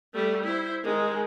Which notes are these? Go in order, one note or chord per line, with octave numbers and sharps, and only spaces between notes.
G3 A3
E4 C5
D#3 G#3